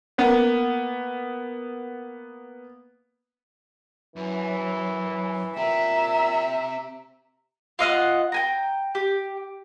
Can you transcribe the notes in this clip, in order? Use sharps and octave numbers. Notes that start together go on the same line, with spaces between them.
A#3 B3
F#2 E3
A#2 C4 G4 E5 A#5
F4 D#5 F5 F#5
G5 G#5 A#5
G4